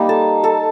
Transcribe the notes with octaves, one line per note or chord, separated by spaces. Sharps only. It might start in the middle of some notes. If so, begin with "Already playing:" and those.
Already playing: G3 A#3 D#4
A4 A5
A4 A5